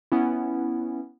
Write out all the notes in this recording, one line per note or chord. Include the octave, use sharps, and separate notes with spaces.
B3 C#4 E4